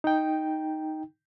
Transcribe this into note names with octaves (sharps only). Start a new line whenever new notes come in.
D#4 G5